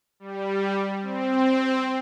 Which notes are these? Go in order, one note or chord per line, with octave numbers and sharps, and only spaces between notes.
G3
C4